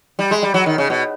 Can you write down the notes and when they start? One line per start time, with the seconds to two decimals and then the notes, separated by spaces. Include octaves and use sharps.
0.19 G3
0.31 G#3
0.43 G3
0.54 F#3
0.66 D#3
0.78 C#3
0.90 B2